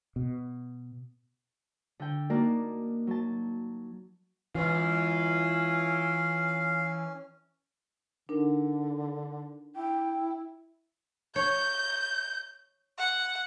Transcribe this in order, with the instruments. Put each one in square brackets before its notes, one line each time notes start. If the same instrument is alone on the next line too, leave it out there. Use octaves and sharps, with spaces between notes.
[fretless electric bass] B2
[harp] D3 G5
A#3 D#4 F#4 A#4 D5 A5
F#3 A5
[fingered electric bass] E3 [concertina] C#4 [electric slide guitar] F4 B4 [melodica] F5
[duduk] D3 [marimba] D4 D#4 A#4
[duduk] E4 [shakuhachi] G5
[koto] C#5 [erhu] G6
[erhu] F#5